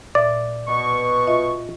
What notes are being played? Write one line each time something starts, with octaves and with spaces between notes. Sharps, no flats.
A#2 D5 E5 D6
B2 C#6
F4 D#5 E5